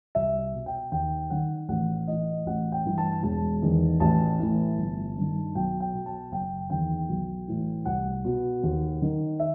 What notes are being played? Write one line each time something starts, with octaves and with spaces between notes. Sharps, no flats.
C2 E5
B2
G5
D#2 G5
D#3 F#5
A1 F#5
A2 E3 D#5
A1 F#5
G5
G2 E3
A5
E1 A5
E2 D#3
A1 A5
A2 E3
G1
G2 D#3
B1 G5
G5
B2
A5
F#1 G5
E2 D#3 G5
B1
A2 E3
C2 F#5
B2
D#2
D#3
E5